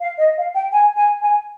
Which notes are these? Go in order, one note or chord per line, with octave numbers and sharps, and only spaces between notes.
F5
D#5
F5
G5
G#5
G#5
G#5